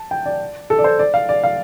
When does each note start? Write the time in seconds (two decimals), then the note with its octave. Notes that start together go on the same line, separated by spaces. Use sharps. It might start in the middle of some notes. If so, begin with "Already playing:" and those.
Already playing: A5
0.11 G5
0.26 D5
0.70 A4
0.79 D5
0.84 C5
0.99 D5
1.14 F5
1.29 D5
1.43 F5